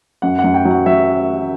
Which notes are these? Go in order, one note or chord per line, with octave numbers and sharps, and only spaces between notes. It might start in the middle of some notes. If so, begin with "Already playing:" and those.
F#2 F#5
F#5
F#2
G5
F#3
F#5
F#3 E5